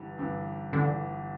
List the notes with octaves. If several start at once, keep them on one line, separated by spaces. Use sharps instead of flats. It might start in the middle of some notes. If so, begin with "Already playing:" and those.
Already playing: G1 G2 E3
G1 G2 E3
G1 G2 D3 E3